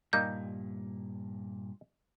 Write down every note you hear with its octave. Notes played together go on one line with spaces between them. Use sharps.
G2 A#2 G3 A#3 D#4 G6